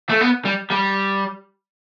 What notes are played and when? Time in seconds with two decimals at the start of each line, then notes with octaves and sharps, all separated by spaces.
0.09 A3
0.21 B3
0.45 G3
0.71 G3